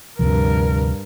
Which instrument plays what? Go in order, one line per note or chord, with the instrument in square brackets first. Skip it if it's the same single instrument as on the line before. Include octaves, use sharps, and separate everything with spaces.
[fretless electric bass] D2 C3 F3 [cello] G2 A#4